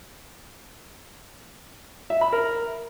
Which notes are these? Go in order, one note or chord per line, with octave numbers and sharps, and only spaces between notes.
E5
B5
A#4